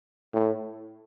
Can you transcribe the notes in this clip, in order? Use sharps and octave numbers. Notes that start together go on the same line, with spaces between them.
A2